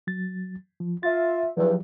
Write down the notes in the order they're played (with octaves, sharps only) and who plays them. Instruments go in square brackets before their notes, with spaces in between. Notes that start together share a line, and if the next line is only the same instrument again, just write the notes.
[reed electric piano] F#3 A6
F3
[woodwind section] F4 E5 [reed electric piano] A6
[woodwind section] E2 G2 [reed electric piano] F3 F#3